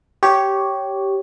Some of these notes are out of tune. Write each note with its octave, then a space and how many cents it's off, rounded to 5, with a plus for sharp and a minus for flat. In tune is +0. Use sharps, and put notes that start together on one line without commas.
G4 -10 C#5 +0